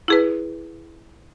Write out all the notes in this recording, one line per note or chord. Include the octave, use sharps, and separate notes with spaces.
E4 G#4 B4